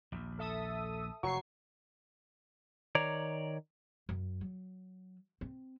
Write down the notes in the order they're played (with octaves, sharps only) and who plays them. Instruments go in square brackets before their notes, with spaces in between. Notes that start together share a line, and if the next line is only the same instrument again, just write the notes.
[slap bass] A#1 D#2
[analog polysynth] A4 E5 D#6
[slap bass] F1 [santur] F#3 C#5 [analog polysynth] C#6 C7
[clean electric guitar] D#3 C#5 D5 A#5
[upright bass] F#2
F#3
C4